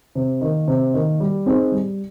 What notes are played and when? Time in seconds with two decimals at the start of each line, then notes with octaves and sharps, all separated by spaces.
0.15 C3
0.41 D#3 A#3
0.68 C3
0.94 D#3 A#3
1.20 G3
1.46 C4 D#4 G#4
1.72 G3